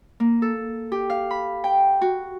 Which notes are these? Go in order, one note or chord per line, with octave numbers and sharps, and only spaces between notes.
A#3
A4
G4
F5
B5
G5
F#4